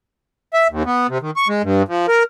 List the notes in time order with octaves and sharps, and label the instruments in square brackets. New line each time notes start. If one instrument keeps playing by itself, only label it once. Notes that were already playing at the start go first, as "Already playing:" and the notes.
[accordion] E5
D#2
B3
C3
D#3
C#6
G#3
G2
F3
A#4